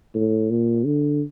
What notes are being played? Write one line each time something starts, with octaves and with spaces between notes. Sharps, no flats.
A2
A#2
D3